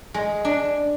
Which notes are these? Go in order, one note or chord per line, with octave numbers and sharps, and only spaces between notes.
G#3
D4